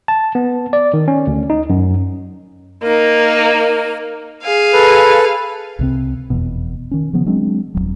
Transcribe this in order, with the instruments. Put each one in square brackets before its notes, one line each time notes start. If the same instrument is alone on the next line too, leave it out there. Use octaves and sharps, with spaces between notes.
[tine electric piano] A5
B3
D5
D#3
C#4
D2
D#4
F#2
[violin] A#3 D#4 [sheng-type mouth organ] A#4
[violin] G#4 F5
[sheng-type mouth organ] A4 B4
[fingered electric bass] C2 C3 C4
F1 E2 B2
D#3 C#4
C#3 E3 F3 B3
F#3 G#3 C4 D4
D#1 A#1 F#3